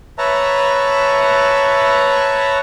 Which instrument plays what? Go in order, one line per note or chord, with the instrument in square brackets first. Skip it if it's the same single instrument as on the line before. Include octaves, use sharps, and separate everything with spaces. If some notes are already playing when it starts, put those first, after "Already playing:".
[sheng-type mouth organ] B4 C#5 E5 A5 A#5